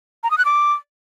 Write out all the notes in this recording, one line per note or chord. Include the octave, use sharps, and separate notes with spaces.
A#5
D#6
F#6
D6